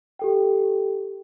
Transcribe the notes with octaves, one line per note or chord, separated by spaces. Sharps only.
G4 A4 G5